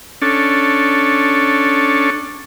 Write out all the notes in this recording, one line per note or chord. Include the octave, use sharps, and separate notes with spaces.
C#4 D4 A4